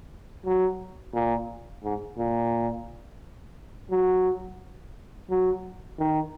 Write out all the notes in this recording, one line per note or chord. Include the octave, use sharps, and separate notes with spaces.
F#3
A#2
G#2
A#2
F#3
F#3
D#3